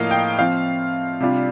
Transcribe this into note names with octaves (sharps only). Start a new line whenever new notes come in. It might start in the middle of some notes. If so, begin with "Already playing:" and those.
Already playing: A2 F3 A#3 D#5 F5
G5
F3 C4 F4 F5
C3 G3 D4 F4